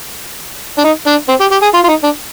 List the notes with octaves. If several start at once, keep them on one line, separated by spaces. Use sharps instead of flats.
D4
D#4
D4
C4
G4
G4
G#4
F4
F4
D#4
D4